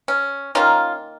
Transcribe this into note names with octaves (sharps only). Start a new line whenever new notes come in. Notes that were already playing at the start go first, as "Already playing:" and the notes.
C#4
D#3 A#3 C#4 F4